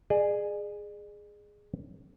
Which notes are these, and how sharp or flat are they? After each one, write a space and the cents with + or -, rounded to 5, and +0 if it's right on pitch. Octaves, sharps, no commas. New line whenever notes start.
G#4 +0 D5 +40